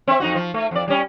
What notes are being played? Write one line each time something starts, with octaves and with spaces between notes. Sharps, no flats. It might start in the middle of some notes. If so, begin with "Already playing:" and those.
C4 E5
F2 D#4 F#4
F3
A3
F2 D5
G3 C#4